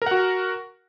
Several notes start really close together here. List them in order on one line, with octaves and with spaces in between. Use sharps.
A#4 F#5 F#4